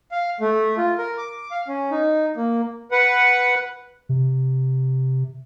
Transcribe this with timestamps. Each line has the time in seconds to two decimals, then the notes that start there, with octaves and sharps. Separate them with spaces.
0.12 F5
0.41 A3
0.78 F4
0.98 A#4
1.18 D6
1.51 F5
1.68 C#4
1.91 D#4
2.36 A#3
2.91 B4 F#5
4.09 C3